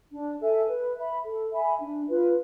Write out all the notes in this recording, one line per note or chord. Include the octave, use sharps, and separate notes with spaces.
D4
A4 E5 G#5
B4
E5 B5
A4
E5 G#5 B5
D4
F4 B4